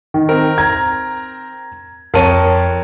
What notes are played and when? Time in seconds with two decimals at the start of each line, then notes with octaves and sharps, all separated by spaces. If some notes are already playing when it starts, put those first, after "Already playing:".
0.14 D#3
0.29 C4 A#4
0.58 A#5 G#6
2.14 F2 A#4 C#5 A5 D#7